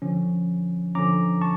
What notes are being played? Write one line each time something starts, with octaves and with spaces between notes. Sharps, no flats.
D3 F3 C#4
D3 F3 C#4 A#5 D6
A5 C#6